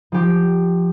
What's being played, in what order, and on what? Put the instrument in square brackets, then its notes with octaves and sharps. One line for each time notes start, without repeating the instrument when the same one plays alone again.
[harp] F3 G4